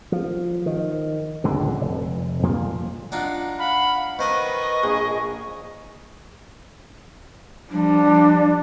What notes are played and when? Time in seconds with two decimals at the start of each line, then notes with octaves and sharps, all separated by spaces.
0.12 F3
0.66 D#3
1.44 D1 C#2 F#2 D3
1.81 F1
2.43 F2 A#2 F3 A#3
3.12 D4 D#4 F4 F#5
3.59 F5 F#5 B5
4.19 D#3 B4 C5 D#5 C#6 D#6
4.84 A#1 G#4
7.70 F3 G3 D4